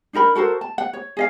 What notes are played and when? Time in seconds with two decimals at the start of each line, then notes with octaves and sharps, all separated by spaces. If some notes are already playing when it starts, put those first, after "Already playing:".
0.13 D4 D#4 A#4 B5
0.35 F#4 A4 A#4 C5
0.61 A5
0.78 F#5
0.93 C#5
1.17 G#4 D#5 F5